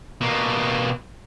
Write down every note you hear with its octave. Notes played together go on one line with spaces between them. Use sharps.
B2 A#3